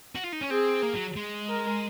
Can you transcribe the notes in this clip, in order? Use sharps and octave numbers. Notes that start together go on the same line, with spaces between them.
F#4
F4
D#4
C#4
C4 G#4
A#3
F#3
G#3
A#4